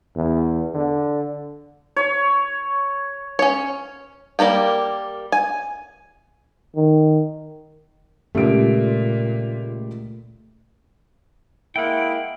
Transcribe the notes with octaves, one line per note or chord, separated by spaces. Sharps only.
E2
D3
C#5
C#4 C#5
G3 A#3 A#4 G5
G#5
D#3
C#2 A#2 A3 G4 D7
G#3 A#3 E4 F#5 G5